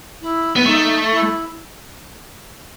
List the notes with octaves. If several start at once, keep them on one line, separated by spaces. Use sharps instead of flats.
E4
B3
A3 D#4
E4